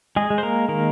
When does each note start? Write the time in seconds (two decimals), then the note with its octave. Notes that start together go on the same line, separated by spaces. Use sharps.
0.16 G#3 G#4
0.30 G#3
0.38 C5
0.43 A#3 A#4
0.68 D#3 A#3 A#4